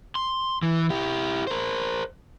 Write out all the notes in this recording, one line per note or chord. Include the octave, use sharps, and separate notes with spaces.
C6
E3
E4 G4
A#4 C5